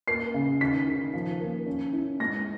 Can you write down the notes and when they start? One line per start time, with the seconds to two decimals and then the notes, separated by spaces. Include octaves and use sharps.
0.08 A#3 C7
0.34 C#3
0.61 D#3 B6
0.87 D#3
1.13 F3
1.40 A#3
1.66 C#4
1.93 E4
2.20 G#3 A#6